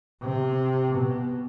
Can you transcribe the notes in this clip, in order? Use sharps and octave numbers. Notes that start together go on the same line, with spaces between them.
C3
B2